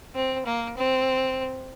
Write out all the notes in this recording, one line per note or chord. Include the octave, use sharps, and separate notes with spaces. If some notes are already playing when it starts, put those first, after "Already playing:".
C4
A#3
C4